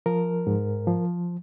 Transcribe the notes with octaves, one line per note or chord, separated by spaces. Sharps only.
F3 A#4
G#2
F3